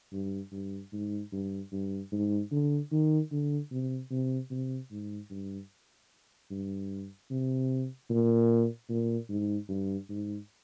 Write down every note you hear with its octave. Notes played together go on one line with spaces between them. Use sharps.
G2
G2
G#2
G2
G2
G#2
D3
D#3
D3
C3
C3
C3
G#2
G2
G2
C3
A#2
A#2
G#2
G2
G#2